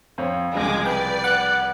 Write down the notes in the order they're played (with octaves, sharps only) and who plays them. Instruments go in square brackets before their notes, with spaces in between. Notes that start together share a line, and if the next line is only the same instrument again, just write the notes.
[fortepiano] F2 C5 C#5
[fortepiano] C2 C#3 F3 [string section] G#3 D6
[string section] B4 D5 [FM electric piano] G5
[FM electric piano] F#5 F#6